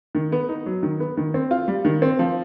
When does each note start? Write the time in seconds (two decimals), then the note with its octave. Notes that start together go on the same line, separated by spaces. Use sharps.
0.15 D#3
0.32 B3
0.49 D#4
0.66 F#3
0.83 D#3
1.00 B3
1.17 D#3
1.34 C4
1.51 F4
1.68 G3
1.85 D#3
2.02 C4
2.19 F3